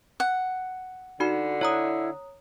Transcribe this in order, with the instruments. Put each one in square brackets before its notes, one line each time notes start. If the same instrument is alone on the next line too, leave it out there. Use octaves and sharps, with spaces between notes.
[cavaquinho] F#5
[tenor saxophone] D3 [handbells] D#4 F#4 B5
[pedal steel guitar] E4 [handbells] C#5 A#5 D#6